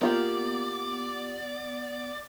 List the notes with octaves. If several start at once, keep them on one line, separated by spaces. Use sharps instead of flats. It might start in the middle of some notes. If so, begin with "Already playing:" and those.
A#3 B3 F4 G4 D5